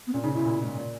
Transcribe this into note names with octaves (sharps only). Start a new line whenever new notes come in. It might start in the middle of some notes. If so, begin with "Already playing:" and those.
B3
A#2 C#4
C#3 D#4
B2 E4
A#2
G#2
A#2